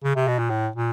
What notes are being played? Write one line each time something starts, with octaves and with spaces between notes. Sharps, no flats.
C#3
C3
B2
A#2
A2
A#2